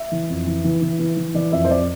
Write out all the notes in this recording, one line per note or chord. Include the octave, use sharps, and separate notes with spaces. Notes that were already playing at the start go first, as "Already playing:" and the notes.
Already playing: E5
E3
F2
E3
E3
E3
E3
E3
E3 D5
F2 E5
C5
F2 D5